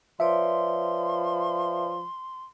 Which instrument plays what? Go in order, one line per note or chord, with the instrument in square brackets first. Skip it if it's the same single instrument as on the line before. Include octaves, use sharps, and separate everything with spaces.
[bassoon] F3 [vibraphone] B4 C#5 D5 [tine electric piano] E5 [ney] C6